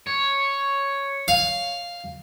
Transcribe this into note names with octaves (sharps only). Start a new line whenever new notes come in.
C#5
F5